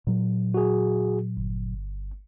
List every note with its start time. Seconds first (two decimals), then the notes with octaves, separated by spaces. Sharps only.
0.07 A#2 F#3
0.54 F#4 G#4
1.37 G1